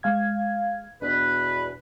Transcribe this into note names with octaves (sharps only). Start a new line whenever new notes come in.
G#3 F5 G#6
E2 B2 D4 B4